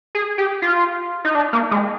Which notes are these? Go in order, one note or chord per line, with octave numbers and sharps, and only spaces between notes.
G#4
G4
F4
D#4
D4
A#3
G#3